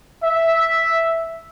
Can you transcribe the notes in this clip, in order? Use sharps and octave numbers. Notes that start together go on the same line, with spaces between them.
E5